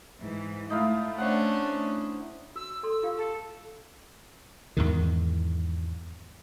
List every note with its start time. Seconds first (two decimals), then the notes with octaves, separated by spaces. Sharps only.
0.19 G#2 E3
0.70 A3 D#4 E4 F5
1.18 C#4 D4 C5 F#5
2.55 F#4 E6
2.83 A4 C6
3.03 F4 G4 F5
3.17 A4
4.77 E2 G#2 D#3